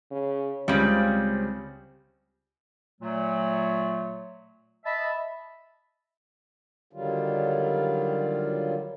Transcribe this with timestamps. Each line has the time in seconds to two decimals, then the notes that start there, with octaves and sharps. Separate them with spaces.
0.11 C#3
0.68 C#2 C#3 G3 C4
3.01 A#2 F#3 A3
4.85 D#5 E5 A5 B5
6.93 D3 D#3 F#3 G3 F4